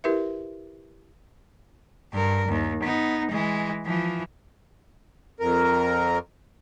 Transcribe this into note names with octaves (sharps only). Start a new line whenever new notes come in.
E4 G4 A#4 B4 E5
G2 A#4
D#2
B3 D#4
E3 G#3
E3 F3
F2 A#4